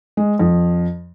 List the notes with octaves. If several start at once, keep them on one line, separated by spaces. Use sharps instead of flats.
G#3
F2